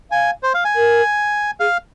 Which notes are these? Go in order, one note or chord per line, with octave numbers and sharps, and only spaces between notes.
F5 G#5
C5
F5
G#5
A#4
G#4 F5